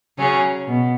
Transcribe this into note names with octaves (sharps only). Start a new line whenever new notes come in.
C#3 F#3 C#4 G#4
B2